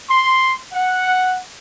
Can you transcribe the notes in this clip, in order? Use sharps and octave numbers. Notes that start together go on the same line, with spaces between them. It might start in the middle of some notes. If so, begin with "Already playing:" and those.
C6
F#5